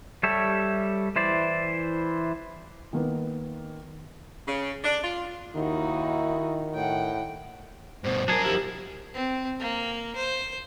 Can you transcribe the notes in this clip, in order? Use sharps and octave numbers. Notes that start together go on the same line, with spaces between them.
G3 G4 A4 C#5 E5
E3 E4 C5 D5
D#3 A#3 B3
C#3
D4
F4
D#2 D#3 D#4 E4 F#4
A2 F#5 G5
G2 B2 C5
F#3 D4 G#4 A#4
D#3 F3 E4 G4
C4
A#3
C5